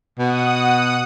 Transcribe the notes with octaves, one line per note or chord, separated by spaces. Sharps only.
B2 F#5 D#6